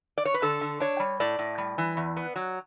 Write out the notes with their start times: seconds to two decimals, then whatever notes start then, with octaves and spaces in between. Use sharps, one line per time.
0.18 D5
0.25 C#5
0.34 B4
0.42 D3 A4
0.61 D3
0.80 D4 C#5
1.00 G3
1.20 A2 D5
1.39 A2
1.58 G3
1.78 E3
1.97 E2
2.16 B3
2.36 F#3